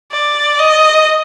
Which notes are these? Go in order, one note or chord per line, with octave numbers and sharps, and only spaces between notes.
D5
D#5